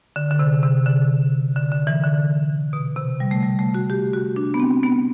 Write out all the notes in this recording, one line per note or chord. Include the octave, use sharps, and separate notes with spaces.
D3
D3
C3
C3
D3
D3
D3
E3
D3
B2
C3
G3
A3
G3
A3
F#4
G4
F#4
D4
B3
C4
B3